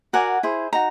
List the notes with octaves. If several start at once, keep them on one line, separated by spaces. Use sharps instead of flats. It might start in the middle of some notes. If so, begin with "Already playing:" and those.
F#4 A#4 D5 F#5 G#5
E4 G#4 C5
D#4 F#4 A#5